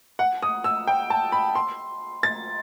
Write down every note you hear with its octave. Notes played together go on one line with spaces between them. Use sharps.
F#5
D#6
E6
G5
A5
B5
C6
A6